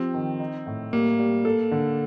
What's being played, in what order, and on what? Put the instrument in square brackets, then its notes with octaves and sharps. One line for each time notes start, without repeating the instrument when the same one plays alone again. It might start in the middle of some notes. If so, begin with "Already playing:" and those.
Already playing: [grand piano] F3 F4 G4 [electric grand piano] C4
[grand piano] D#3
D#4
A2
[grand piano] G3 [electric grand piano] A#3
[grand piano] G3
A4
D3